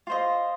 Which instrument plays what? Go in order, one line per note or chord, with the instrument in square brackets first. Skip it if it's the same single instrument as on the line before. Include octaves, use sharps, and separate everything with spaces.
[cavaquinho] F4 C5 D#5